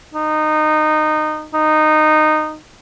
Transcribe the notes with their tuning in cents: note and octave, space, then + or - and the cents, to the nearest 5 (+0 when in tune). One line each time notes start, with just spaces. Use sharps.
D#4 -20
D#4 -15